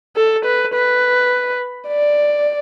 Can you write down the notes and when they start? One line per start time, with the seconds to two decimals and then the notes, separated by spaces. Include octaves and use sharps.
0.16 A4
0.45 B4
0.74 B4
1.88 D5